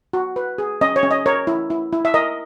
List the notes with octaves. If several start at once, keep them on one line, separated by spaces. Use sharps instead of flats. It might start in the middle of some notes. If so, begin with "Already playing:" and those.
F#4
B4
G#4
C#4 D#5
C#5
C#4
D#5
A#4 C#5
E4
E4
E4
E5
A#4 D#5